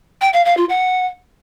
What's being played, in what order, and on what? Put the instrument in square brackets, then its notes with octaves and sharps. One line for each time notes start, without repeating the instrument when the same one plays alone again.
[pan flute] G5
F5
F5
F4
F#5